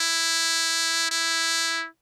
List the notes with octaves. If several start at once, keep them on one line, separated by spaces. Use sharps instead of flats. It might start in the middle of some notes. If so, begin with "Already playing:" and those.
Already playing: E4
E4